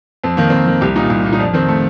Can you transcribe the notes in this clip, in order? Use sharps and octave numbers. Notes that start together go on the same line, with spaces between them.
F2 C4
D#3 A#3
F2 C4
D#3
C2 G4
A#2 D#4
C2
A#2
D#4
F2 D4
D#3 C4
A3